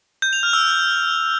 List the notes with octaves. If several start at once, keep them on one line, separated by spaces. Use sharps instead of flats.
G6
F7
F6
E6